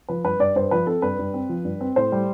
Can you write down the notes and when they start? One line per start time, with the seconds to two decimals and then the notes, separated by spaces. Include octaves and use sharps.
0.08 F3 B4
0.24 G2 B4
0.40 G2 D5
0.56 G2 C5
0.71 F3 B4
0.87 C4 A4
1.02 G2 B4
1.19 G2
1.34 C4
1.49 F3
1.65 G2
1.81 C4
1.96 A2 C5
2.12 G3